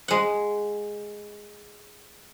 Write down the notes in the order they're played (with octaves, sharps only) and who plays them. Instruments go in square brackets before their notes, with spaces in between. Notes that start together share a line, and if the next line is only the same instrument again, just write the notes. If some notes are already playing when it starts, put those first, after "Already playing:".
[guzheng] G#3 F#5